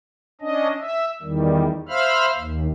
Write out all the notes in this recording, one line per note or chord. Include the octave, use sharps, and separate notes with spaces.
C#4 D4 D#5
E5
E2 D#3 G3
C5 E5 F5 B5 F6
D#2